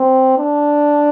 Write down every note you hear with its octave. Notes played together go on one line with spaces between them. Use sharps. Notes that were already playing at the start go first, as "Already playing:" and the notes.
Already playing: C4
D4